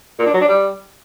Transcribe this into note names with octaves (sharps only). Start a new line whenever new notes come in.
A#2
D4
F#3
D4
G3